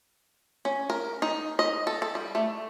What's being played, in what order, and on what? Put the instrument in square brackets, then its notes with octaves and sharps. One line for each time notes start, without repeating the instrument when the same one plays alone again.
[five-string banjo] C#4
A#4
D#4
D#5
A4
A4
G3
A3